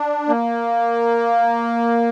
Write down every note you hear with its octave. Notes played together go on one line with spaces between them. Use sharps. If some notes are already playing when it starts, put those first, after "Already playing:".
Already playing: D4
A#3